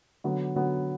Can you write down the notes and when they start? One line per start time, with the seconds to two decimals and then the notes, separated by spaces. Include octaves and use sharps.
0.24 D3 F#3 B3
0.56 D3 F#3 B3